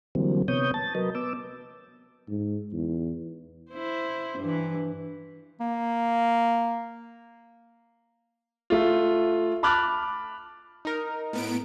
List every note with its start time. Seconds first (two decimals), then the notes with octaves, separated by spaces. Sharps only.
0.15 D3 E3 F#3 G3 A#3 C4
0.48 C3 B3 C#5 D#6 G6
0.74 A5 A6
0.95 F#3 A#4 B4 D#5
1.15 B3 D6 E6
2.28 G#2
2.73 E2
3.71 E4 C5
4.38 G2 E3
5.60 A#3
8.70 A3 F4
9.63 A5 B5 D6 F6 F#6 A6
10.85 D#4 A#4
11.33 A2 B3 D7